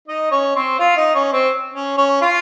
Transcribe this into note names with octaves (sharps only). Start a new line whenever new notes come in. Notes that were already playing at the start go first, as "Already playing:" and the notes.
D#4 D#5
C#4 C#5
C4 C5
F4 F5
D#4 D#5
C#4 C#5
C4 C5
C#4 C#5
C#4 C#5
F4 F5